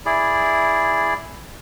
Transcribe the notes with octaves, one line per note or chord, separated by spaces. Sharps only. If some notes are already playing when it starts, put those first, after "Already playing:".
E4 G#4 D5